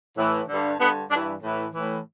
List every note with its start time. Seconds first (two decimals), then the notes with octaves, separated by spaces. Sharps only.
0.17 A2 E3
0.49 G2 D3
0.79 G2 D3 B3
1.10 G2 D4
1.16 E3
1.42 A2 E3
1.73 A2 E3